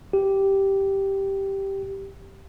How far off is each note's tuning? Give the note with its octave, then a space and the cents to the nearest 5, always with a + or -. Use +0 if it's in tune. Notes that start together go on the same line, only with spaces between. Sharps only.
G4 -5